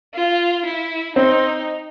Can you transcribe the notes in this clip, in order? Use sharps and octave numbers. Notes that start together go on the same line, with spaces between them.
F4
E4
C4 D#4